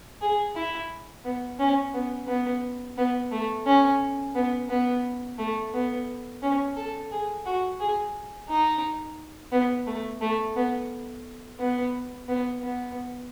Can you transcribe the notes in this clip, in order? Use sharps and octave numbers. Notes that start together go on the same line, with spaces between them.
G#4
E4
B3
C#4
B3
B3
B3
A3
C#4
B3
B3
A3
B3
C#4
A4
G#4
F#4
G#4
D#4
B3
A3
A3
B3
B3
B3
B3